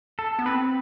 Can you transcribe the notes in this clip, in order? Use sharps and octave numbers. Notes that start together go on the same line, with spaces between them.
A4
B3
C4 B4